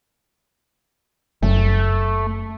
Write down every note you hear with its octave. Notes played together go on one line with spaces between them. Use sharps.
F#1 A3